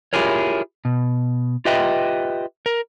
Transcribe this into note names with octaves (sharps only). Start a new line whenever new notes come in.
E4 F4 G4 G#4 A#4 C#5
B2
F4 G4 B4 D#5 E5 G5
A#4